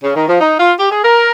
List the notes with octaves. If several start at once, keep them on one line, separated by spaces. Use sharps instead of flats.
C#3
D#3
F3
D#4
F4
G4
G#4
A#4